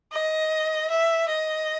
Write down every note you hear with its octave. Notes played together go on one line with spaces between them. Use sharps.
D#5
E5
D#5